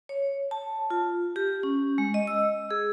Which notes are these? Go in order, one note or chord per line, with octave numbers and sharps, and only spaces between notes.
C#5
A5
F4
G4
C#4
G#3
D#5
E6
G#4